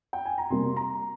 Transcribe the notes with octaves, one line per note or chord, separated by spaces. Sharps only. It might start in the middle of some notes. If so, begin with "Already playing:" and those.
G5
G#5
A#5
C3 G3 A#3 C6
A#5